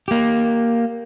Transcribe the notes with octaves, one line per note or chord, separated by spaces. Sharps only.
A#3 G4